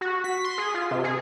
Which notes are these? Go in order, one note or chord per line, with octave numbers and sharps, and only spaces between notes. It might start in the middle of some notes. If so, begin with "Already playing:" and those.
F#4
B6
C6
G#4
F4
C3
G#4